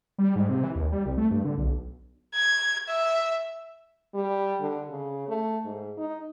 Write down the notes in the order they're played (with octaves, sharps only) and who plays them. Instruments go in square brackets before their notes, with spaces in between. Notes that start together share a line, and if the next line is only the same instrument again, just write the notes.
[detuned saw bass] G3
G#2
C3
E3
D#2
G3
C2
A3
G2
D3
B1
[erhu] G#6
E5
[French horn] G3
D3
C#3
A3
G#2
D#4